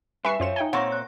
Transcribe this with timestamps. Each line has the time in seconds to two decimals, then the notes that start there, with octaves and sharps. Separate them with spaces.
0.25 G2 B4 E5 G#5 C#6 C7
0.40 F#2 F4 C5 C#5 E7
0.56 D#4 G5 G#5 G7
0.73 A#2 C4 C#5 F#5 C#6 A#6
0.92 F#6